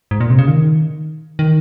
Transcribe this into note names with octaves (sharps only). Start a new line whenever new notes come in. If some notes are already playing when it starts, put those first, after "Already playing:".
G#2
A#2
C3
C#3
D#3
D#3